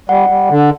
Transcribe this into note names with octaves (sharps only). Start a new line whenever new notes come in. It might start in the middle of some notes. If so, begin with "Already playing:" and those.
G3 F#5
G3
D3